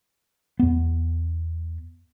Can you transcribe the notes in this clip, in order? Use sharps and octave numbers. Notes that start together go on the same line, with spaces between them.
E2 B3